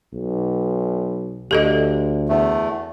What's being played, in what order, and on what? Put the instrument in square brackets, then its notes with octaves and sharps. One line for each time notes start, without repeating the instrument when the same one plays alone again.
[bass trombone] B1
[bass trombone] D2 [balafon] G4 A4 D#5
[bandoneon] E2 A3